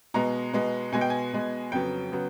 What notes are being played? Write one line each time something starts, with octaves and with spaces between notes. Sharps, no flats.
B2 G#3 B3 A#5
B2 G#3 B3
B2 G#3 B3 G#5
G5
G#5
B2 G#3 B3
F2 C#3 F#3 B3 G5
C#3 F#3 B3